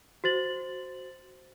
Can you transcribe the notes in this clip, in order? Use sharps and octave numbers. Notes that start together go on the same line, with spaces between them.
F#4 C5 A6 F#7